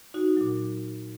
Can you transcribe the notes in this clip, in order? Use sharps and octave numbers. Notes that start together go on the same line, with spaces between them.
D#4 F#4
A#2 F#3